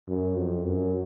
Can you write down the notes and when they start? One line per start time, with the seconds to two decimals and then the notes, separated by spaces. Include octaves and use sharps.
0.08 F#2
0.37 F2
0.66 F#2